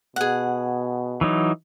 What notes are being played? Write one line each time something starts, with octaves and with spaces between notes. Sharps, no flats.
B2 G#4 F#5
E3 F#3 D#4